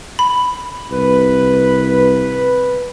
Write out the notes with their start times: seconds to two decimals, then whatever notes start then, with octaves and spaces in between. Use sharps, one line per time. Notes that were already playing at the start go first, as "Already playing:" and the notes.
0.19 B5
0.91 C2 B4